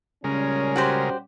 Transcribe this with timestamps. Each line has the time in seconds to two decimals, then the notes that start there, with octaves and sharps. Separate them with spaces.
0.24 A#2 C#3 G3 G#3 C#4 A#4
0.76 F#4 G4 C5